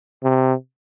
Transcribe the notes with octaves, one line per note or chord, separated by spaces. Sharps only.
C3